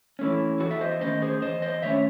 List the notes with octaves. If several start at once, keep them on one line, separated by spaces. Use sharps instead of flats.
E3 A3 C#4
E2 F#4 A4
E5
C5 D#5
D#3 A3 C#4 C5 D#5
G#4 C5
E2 C5 D#5
C5 D#5
D#3 A3 C#4 C#5 E5